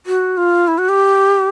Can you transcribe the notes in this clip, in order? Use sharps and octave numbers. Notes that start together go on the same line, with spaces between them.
F#4
F4
E4
F#4
G4